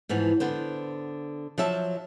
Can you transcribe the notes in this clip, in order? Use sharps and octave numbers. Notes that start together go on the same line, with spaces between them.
G#2 E3 F3 B3
D3 B3 C5
F3 F#3 E5 A5